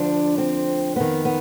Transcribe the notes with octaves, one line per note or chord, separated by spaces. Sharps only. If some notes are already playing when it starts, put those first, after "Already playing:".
Already playing: D2 D3 F3 D4
C4
F2 D#3 B3
B3